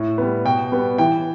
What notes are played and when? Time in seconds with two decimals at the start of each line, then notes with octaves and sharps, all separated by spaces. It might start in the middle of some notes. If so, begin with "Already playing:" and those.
Already playing: A2
0.18 G3 B3
0.45 B2 G5
0.72 G3 B3
0.98 E3 G5